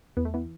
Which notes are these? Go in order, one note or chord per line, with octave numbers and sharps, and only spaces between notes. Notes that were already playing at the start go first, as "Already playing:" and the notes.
E2 B3
A3
E3 B3